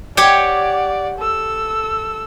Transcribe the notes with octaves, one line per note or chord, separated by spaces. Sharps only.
G4 C#5 D5 F#5 G5
A4 E6